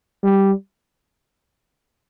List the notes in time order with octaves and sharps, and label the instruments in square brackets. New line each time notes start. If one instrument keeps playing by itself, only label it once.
[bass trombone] G3